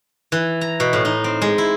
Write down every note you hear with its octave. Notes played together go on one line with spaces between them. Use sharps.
E3
A#5
B2
A2
D#4
C4
G#3
E4